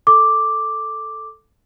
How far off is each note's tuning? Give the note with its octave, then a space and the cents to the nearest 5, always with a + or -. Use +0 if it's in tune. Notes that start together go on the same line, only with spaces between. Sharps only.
A4 +0 D6 +0